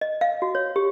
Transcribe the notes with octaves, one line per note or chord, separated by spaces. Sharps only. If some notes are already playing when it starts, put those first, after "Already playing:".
D#5
F5
F#4
C#5
G4